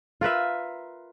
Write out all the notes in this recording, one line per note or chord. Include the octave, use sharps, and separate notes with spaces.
F4 A#4 B4 E5